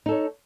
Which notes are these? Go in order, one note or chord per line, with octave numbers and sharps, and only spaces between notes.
D#4 A4 C#5